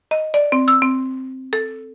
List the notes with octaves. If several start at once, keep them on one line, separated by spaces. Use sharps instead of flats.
D#5
D5
C4
E6
C4
A4